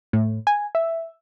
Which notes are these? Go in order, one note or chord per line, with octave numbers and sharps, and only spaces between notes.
A2
G#5
E5